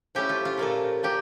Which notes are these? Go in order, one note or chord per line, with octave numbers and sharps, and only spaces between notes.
F3 A3 C#4 E4 G4
F4
F4
A#2 F3 A#3 F4 A4
A#2 F3 A#3 G4